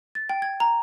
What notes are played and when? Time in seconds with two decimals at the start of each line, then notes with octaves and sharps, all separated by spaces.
0.15 A6
0.30 G5
0.42 G#6
0.60 A#5